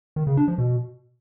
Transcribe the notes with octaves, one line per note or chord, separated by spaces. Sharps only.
D#3
C#3
D4
F3
B2